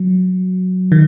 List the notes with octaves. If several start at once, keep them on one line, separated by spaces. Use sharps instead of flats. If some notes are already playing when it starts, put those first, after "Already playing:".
Already playing: F#3
D#3